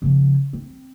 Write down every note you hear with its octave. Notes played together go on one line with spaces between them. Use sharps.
C#3 F3
C4